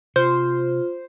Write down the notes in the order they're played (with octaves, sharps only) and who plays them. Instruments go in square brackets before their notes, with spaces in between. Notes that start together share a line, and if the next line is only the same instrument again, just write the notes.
[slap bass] C3 [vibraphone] F4 [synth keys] C5